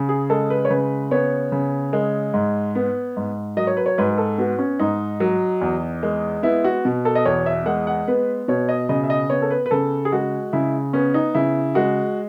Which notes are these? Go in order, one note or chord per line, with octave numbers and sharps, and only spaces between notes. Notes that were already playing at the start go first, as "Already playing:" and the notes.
Already playing: C#3
G#4
G#3 A4
B4
C#5
C#3 B4
B3 C#5
C#3
G#3
G#2
B3
G#2
F#3 D#5
C#5
B4
C#5
G#2 B4
B4
A4
B3 F#4
C#4
G#2 D#4
F#3
E2
G#3
B3 E4
F#4
B2
A4
D#5
E2 C#5
E5
G#3 F#5
F#5
B3 B4
B2 C#5
D#5
C#3 D#5
E5
D#5
B3 C#5
A4
B4
B4
C#3 A4
G#4
G#3 F#4
C#3 E4
B3 C#4
D#4
C#3 E4
G#3 F#4